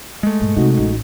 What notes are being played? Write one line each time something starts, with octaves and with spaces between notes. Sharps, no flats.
G#3 A3
G2 A#2
C3 D#4 F#4
A1